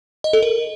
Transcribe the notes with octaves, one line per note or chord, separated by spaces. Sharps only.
D#5
A4
A#4